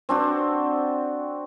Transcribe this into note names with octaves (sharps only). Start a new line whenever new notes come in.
C4 D4 F#4